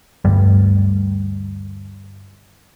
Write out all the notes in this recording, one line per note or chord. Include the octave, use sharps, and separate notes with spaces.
D2 G2 G3